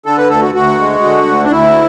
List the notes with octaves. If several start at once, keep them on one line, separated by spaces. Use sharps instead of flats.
D3 A4
B4
D2 A4
F#4
D2 F#4
G#3
D3
D2
D4
D2 E4